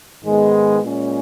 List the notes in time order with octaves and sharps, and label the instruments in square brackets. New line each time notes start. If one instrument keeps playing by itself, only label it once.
[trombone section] G#2 D#3 G#3 B3
A#2 G#3 C#4